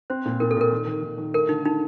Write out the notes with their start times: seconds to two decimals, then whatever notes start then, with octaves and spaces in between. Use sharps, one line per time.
0.10 C4 C5
0.26 A#2
0.40 A#2 A#4
0.51 A4
0.57 A#2 A#4
0.72 D#3
0.87 D#3
1.02 D#3
1.18 D#3
1.34 A3 A#4
1.49 D3 D#4
1.65 D#4